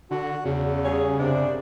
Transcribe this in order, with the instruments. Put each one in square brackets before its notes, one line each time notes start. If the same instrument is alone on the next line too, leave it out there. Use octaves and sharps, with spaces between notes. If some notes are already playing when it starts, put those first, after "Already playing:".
[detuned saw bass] D3 [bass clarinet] F#4
[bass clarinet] E2 [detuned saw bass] C#3
[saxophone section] G3 C#4 G#4
[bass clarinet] F#2 [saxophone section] C3 D4